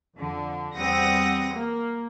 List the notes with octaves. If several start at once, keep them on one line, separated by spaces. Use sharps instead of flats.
F2 D3
E2 G3 C4 F#5 D#6 A#6
A#3